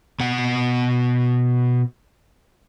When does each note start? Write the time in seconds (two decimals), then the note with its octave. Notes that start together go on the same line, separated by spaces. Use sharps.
0.20 B2 F#5